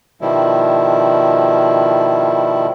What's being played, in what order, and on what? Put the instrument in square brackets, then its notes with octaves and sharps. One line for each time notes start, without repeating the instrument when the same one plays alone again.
[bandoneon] B2 D#3 F3 G3 E4